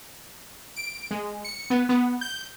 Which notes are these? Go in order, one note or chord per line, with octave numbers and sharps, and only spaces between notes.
D7
G#3
C#7
B3
B3
G6